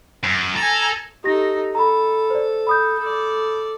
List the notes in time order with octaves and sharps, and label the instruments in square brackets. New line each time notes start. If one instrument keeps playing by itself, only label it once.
[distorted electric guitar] F#2
[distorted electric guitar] A4 [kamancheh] G#5 A#5
[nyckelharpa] D#4 A4 [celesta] G4 A#6
[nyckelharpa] A4 [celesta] A#5 B5
[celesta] C5 D5
B5 D#6 G6
[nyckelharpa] A4 D5